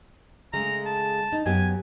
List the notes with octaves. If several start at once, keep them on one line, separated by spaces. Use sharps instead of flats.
C#3 G#3 A3 A#5
A5
D#4
F#2 B3 G4 G#5